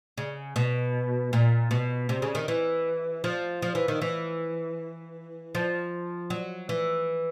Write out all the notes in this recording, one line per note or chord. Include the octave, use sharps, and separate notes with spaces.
C#3
B2
A#2
B2
C3
C#3
D#3
E3
F3
F3
E3
D#3
E3
F3
F#3
E3